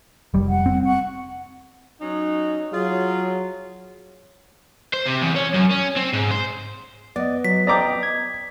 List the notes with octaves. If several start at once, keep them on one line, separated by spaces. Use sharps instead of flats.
F1 G3
F#5
C4
F#5 C#6
F#3 C#4 D#4
F#3 F4 G#4
C5
C3
E2
C#4
F#2
C#4
C4
G#2
C5
B3 D5 D#5
F#3 B6
D5 D#5 G5 A#5 D6
G#6